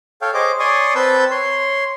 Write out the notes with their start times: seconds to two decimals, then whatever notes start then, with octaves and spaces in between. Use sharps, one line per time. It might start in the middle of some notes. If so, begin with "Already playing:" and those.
0.22 A4 C#5 F5 G5
0.34 G#4 C5 C#5 D#5 D6
0.60 C#5 D5 G#5 C6 C#6 D#6
0.95 C4 B4 A5 E6 G6
1.31 C#5 C6